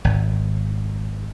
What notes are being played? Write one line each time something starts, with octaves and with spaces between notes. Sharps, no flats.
G#1